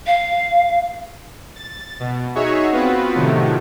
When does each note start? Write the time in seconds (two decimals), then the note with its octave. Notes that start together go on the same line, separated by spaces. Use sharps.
0.07 F5
1.56 A6
2.00 B2
2.35 D#4 F#4 G#4 C#5 E5
2.72 B3 C4 F4 F#4 B4
3.14 A2 C3 D#3 F3 F#3 A3